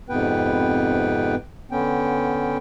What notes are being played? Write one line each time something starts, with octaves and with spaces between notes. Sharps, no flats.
F2 G#2 C3 B3 B4 G5
D3 B3 C#4 G5